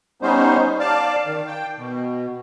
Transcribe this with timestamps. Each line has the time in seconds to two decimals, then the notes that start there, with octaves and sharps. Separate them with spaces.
0.22 G3 B3 C#4 D#4 C5
0.79 D5 F5 A5
1.26 D#3
1.47 G5
1.78 B2